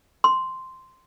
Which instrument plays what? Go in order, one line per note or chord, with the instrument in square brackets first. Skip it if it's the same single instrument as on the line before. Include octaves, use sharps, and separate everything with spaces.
[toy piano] C6